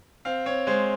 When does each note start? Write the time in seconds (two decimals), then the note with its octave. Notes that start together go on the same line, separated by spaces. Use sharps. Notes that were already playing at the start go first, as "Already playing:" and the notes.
0.25 C4 F5
0.46 C4 C#5
0.67 G#3 C5